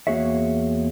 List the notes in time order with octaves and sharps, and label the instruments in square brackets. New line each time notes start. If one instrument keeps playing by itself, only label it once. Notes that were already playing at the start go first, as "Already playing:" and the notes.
[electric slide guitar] E2 A#3 F#4 G#4 C#5 E5